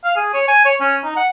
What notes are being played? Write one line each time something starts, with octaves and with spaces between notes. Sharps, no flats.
F5
G#4
C#5
G#5
C#5
C#4
D#4
F#5